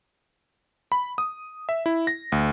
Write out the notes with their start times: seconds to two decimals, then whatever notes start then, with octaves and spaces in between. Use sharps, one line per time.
0.92 B5
1.18 D#6
1.69 E5
1.86 E4
2.07 A#6
2.32 D2